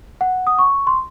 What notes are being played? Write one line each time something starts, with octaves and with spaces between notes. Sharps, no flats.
F#5
D#6
C#6
C6